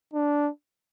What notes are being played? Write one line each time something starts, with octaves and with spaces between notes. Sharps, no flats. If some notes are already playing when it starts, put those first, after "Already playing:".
D4